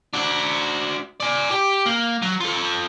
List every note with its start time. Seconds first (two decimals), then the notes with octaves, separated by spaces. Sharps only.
0.13 D4 F#4
1.20 D5 G#5
1.51 G4
1.86 A#3
2.22 F#3
2.40 F4 A4